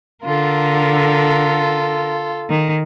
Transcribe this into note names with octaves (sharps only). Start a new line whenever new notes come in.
D3 F4 A4 A#4
D#3